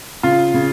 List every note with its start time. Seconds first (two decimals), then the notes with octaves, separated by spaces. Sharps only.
0.23 C#3 F4
0.54 C#3